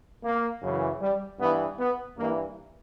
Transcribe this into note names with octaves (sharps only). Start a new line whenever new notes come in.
A#3
F#2 C#3 E3
G3
G2 E3 B3
B3
G2 E3 A#3